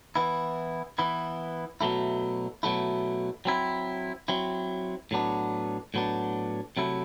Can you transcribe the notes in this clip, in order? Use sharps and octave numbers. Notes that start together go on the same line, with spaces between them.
E3 B3 E4
E3 B3 E4
B2 F#3 A3 E4
B2 F#3 A3 E4
F#3 C4 E4
F#3 C4 E4
A2 F#3 B3 D4
A2 F#3 B3 D4
C3 F#3 A3 E4